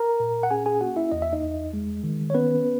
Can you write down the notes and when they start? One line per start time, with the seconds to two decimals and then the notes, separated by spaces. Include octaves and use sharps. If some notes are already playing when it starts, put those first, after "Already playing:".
Already playing: A#4 A#5
0.20 A#2
0.43 F#5
0.51 C#4 G#4 G#5
0.66 G#4 G#5
0.81 A#3 F#4 F#5
0.96 E4 E5
1.12 E2 D#5
1.22 E5
1.33 D#4 D#5
1.42 E2
1.73 G#3
2.03 D#3
2.30 C#5
2.35 B3 C#4 B4